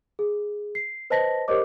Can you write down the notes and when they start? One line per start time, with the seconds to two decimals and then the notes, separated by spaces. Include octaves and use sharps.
0.19 G#4
0.75 C7
1.10 B4 C5 D#5 A5 A#6 B6
1.48 G4 A#4 C5 C#5 D#5 D6